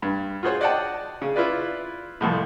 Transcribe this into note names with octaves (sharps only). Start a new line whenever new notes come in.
G2
F4 F#4 G#4 C5 C#5 F#5
D5 D#5 F#5 G5 A5
C#3
E4 F4 B4 D5
C2 F2 A2